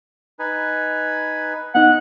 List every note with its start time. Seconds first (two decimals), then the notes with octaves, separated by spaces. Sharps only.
0.39 D#4 B4 G#5
1.75 B3 D#4 D#5 F#5